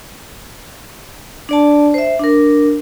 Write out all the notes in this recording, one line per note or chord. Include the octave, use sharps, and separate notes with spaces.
D4 D5 A5
C5 E5
D4 A#4